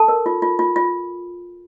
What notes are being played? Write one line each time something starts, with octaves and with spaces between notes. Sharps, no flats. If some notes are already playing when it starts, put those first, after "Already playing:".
Already playing: A4 A5
A#4
F4
F4
F4
F4